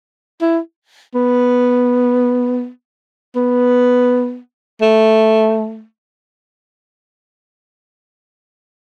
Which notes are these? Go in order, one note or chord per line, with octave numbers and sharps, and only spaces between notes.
E4
B3
B3
A3